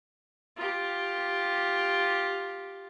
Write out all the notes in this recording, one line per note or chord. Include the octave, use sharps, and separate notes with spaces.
F4 G4